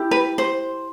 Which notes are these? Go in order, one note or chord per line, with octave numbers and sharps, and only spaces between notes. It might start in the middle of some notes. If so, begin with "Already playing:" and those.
Already playing: E4 G4
B4
C5